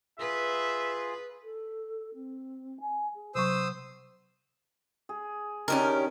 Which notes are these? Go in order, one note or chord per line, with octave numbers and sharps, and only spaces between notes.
F4 G#4 B4 E5
A4
C4
G#5
G#4
C3 F#3 B3 C5 C#6 D#6 E6
G#4
D#3 C#4 D4 G4 A#4